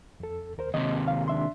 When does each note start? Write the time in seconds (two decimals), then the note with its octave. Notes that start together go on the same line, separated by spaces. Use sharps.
0.20 F2 A4
0.58 D#2 A#4 C5
0.74 D#2 C3 D#5
1.08 F5
1.28 D4 E5 C6